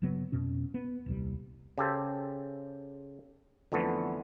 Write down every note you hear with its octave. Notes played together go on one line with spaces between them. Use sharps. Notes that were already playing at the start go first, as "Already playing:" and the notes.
G1 C#3 F#3 B3
F2 B2 C#4
B3
D#1 C2 G3
C#3 G4 A4 C5
F2 D3 E3 A3 B3